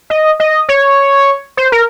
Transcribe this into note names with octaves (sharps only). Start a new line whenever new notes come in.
D#5
D#5
C#5
C5
A#4